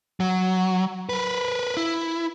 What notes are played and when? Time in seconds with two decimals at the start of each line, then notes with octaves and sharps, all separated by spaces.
0.20 F#3
1.09 A#4 B4
1.77 E4